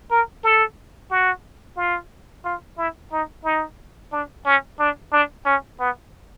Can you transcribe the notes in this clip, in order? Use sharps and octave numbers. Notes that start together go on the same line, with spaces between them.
A#4
A4
F#4
F4
F4
E4
D#4
D#4
D4
C#4
D4
D4
C#4
B3